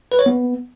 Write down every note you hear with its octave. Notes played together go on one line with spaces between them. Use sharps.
B4
C#5
B3